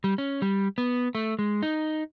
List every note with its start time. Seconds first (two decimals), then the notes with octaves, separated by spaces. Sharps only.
0.04 G3
0.18 C#4
0.42 G3
0.78 B3
1.15 A3
1.39 G#3
1.63 D#4